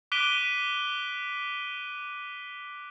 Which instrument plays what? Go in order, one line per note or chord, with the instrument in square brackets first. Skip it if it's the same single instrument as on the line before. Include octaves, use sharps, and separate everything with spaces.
[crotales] D6 F#6 B6 D7 D#7 G7